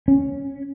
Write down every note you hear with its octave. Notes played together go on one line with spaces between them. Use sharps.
C#4